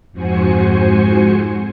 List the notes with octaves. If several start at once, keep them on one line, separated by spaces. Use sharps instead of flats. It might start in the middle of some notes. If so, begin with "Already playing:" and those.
F2 G#2 F#4 C5 G#5 C#7